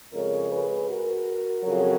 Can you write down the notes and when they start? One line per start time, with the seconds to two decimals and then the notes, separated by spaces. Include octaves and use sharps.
0.13 F2 C#3 G#3 A#4 C#5
0.50 G#4 B4
0.88 F#4 A#4
1.64 F2 C#3 F#3